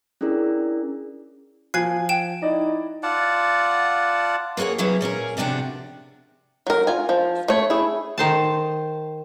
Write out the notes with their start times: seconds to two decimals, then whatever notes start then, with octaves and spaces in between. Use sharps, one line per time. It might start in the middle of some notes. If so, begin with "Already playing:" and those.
0.21 C#4 D4 E4 G#4 A#4 D5
1.74 F3 G#5 F#6 G#6 C7
2.09 G5 E7
2.42 D#4 E4 D5 D#5
3.03 F4 D5 F#5 A5
4.57 A#3 F#4 G#4 C#5 F#5
4.78 C3 E3 F#3 C#4 E4 G#4
5.01 A#2 C#4 G#4 A#4
5.37 D2 C3 F3 D4 F#4 G5
6.67 F#3 A#4
6.87 F4 G#5
7.09 F3
7.48 A3 C#5
7.70 E4 G#4
8.18 D#3 C5 A5